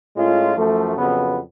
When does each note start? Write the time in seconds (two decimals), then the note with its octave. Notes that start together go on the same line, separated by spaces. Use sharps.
0.15 A2 G#3 C#4 F4
0.56 F#2 F3 A3
0.97 F2 C#3 F#3 B3